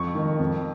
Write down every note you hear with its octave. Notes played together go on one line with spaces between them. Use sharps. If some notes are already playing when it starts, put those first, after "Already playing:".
Already playing: F2 C#6
D#3
F2